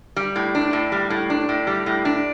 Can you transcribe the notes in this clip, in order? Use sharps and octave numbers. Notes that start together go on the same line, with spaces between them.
G3
A2
D4
A2
G3
A2
D4
A2
G3
A2
D4